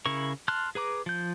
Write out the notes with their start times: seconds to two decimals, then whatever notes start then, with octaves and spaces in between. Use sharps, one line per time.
0.06 C#3 E4 A#4 C#6
0.48 A5 C6 F6 F#6
0.75 G#4 B4 A#5 D6
1.06 F3 G6